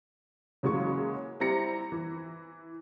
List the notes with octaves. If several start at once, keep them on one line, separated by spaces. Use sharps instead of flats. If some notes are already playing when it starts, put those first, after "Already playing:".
C#3 E3 F#3 G#3 A#3 C#6
G3 C4 E4 A#5 A#6 C#7
E3